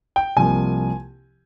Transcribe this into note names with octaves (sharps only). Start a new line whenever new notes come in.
G5
C2 C3 F3 A#3 G#5